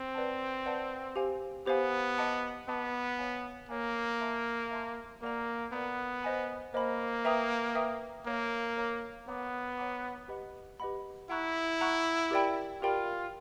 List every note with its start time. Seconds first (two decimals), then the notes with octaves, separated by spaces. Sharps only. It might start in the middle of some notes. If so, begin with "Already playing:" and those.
Already playing: C4
0.15 B4 D5 F#5 A5
0.66 B4 D5 F#5 A5
1.16 G4 C5 F5 G#5
1.66 B3 G4 C5 F5 G#5
2.18 D#5 F#5 A5 D6
2.68 B3 D#5 F#5 A5 D6
3.19 C#5 F5 G#5
3.69 A#3 C#5 F5 G#5
4.20 E5 A5 C6
4.71 E5 A5 C6
5.21 A#3 A#4 D5 F#5 A#5
5.72 B3 A#4 D5 F#5 A#5
6.23 C5 D#5 G#5 B5
6.74 A#3 C5 D#5 G#5 B5
7.25 B4 E5 G5 A#5 D#6
7.75 B4 E5 G5 A#5 D#6
8.26 A#3 A#4 C#5 F5 A#5
8.77 A#4 C#5 F5 A#5
9.28 B3 C#5 F#5 A#5 D6
9.78 C#5 F#5 A#5 D6
10.28 G4 B4 D#5 F#5 B5
10.80 G4 B4 D#5 F#5 B5
11.30 E4 F#5 A#5 C#6 F#6
11.81 F#5 A#5 C#6 F#6
12.31 G4 A#4 D5 G5 B5
12.81 F4 G4 A#4 D5 G5 B5